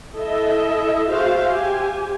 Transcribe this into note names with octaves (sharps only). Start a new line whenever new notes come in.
E4 A4 D#5 E5
F#4 G#4 C5 E5 F5
G4 G#5